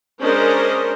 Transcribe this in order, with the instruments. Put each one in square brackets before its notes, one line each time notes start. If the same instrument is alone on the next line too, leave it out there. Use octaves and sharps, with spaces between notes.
[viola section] G#3 C#4 D4 A#4 C5 D#5